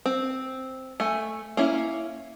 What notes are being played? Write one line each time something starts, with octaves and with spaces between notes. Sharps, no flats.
C4
A3 G#5
A#3 C#4 E4